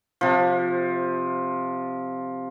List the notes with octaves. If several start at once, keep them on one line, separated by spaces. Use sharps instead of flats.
C3 F3